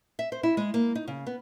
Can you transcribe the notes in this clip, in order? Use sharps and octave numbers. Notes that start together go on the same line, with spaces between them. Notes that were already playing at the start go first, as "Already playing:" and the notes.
E5
C5
E4
G#3
A#3
D#4
C#3
B3